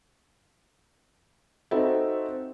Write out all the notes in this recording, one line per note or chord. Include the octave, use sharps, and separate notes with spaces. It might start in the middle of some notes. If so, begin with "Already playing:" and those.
C4 D#4 F#4 A4 E5